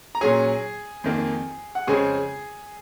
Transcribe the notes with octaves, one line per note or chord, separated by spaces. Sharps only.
A#5
A#2 F#3 C#4 G#4 G#5
F2 D#3 A#3
F#5
F2 C#3 G#3 C4 G#4 G#5